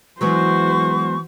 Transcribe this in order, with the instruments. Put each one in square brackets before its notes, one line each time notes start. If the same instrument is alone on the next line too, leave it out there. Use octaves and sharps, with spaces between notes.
[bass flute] E3 [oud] F#3 G#3 B3 [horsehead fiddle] F#4 C5 [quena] C#6